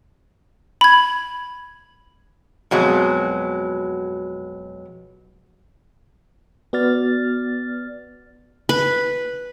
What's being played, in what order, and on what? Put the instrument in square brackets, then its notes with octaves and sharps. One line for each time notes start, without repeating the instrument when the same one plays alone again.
[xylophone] B5 G#6
[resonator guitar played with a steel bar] F2 B2 F#3 G#3
[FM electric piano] B3 F#4 D5 F6 A6
[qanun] B4